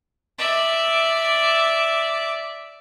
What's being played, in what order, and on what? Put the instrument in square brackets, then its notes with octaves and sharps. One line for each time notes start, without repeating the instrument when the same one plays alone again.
[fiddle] D5 E5